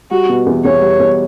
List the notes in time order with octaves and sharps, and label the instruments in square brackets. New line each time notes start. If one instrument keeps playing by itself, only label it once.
[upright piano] G3 [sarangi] F#4
[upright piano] B2
E2
[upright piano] E2 [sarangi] C#5
[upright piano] G3
E2